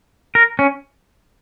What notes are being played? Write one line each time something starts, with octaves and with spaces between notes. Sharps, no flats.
A#4
C#4